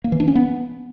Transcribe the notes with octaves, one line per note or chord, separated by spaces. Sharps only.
A#3
E3
D4
C#4
B3